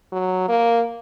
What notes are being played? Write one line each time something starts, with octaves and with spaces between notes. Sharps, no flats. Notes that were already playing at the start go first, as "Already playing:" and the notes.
F#3
A#3